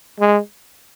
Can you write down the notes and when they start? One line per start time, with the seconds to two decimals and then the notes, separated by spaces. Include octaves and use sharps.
0.20 G#3